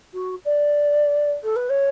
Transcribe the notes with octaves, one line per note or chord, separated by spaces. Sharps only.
F#4
D5
A4
B4
C#5